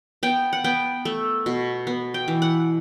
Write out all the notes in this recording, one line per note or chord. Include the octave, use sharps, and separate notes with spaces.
B3 G5
F#5
B3 G5
A3
B2
B3
G5
E3
F#5